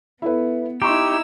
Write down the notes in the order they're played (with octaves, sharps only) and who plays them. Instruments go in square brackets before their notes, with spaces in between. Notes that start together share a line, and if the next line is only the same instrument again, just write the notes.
[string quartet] B3 [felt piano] E4 A4 B4
[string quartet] D#4 E4 E6 [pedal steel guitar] G4 [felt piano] A#5 C6 C#6